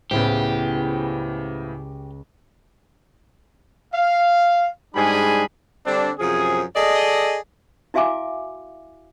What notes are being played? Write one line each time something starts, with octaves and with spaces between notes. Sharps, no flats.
C#2 A2 C#3 B3 E4 G4 C5
F5
G#2 G3 D4 G#4 G#5 B5
D3 G3 C4 D4
F#2 C3 F3 G#4
G#4 A4 D5 D#5
E4 F#4 E5 F5 G#5 D6